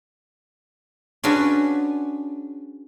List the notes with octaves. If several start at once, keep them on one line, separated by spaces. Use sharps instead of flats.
C#4 D4 F4 F#4 G#4 B4